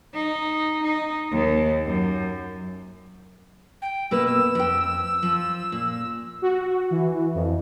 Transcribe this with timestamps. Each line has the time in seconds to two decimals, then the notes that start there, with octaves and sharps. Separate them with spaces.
0.14 D#4
0.84 D#4
1.32 D#2
1.86 F#2
3.82 G5
4.11 B2 A#3 B4 E6
4.26 E6
4.55 F2 G5
5.23 F3
5.72 A#2
6.42 F#4
6.91 E3
7.35 F2